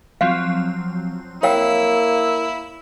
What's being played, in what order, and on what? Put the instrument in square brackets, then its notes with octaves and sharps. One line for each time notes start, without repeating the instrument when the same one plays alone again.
[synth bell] F3 F#3 C4 [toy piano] F5
[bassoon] A#3 [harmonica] E4 [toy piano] C#5 F5 G5 [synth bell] E6